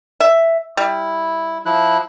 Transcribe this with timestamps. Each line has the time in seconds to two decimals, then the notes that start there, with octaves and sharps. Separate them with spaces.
0.20 E5
0.77 G3 E4
1.66 F3 E4 F#6